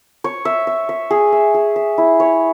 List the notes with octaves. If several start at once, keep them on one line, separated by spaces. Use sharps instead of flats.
C#5
E5
E5
E5
G#4
E5
G#4
E5
E4
C#5